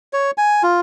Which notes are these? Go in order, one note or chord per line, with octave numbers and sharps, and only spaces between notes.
C#5
G#5
F4